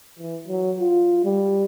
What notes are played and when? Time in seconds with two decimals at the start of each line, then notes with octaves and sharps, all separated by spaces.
0.19 E3
0.48 F#3
0.80 F4
1.24 G3